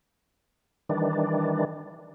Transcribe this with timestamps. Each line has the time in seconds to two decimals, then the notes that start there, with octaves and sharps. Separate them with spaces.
0.89 D#3 E3 G3 D4